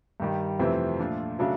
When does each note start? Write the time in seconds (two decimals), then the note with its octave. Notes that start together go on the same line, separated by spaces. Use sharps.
0.20 G2 D#3 G3
0.59 F2 C3 E3 A3 C4
0.99 A#2 F3 A3 D4 F4
1.39 C#3 F#3 A3 D4 F#4